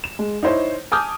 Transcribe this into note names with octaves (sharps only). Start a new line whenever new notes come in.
E7
G#3
D#4 E4 C5 C#5
G#5 A5 D6 D#6 F6 G6